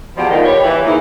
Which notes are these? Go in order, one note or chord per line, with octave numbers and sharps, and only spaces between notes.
E2 B2 F3 G4 D5 F#5
A2 D#3 F3
G4 B4 C#5
E3
G#2 D#3 A#3 E4